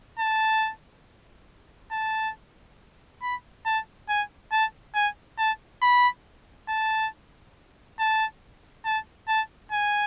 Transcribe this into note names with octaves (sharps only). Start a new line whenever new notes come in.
A5
A5
B5
A5
G#5
A5
G#5
A5
B5
A5
A5
A5
A5
G#5